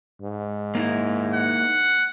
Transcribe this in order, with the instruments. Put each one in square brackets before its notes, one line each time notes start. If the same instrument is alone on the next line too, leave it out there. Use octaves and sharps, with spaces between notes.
[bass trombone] G#2
[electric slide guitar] A#3 D#4 E4
[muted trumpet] F#5